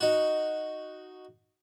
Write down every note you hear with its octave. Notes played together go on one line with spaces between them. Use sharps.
D#4 F#4